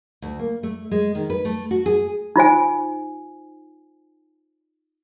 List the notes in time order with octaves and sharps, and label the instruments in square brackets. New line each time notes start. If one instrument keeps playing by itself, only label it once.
[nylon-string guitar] D2
A#3
A3
G#3
D#3
B4
A3
F#4
G#4
[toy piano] D#4 F4 C5 G#5